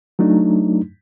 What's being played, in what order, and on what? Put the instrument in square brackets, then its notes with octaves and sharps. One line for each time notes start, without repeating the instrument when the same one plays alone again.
[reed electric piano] F#3 A3 D4 D#4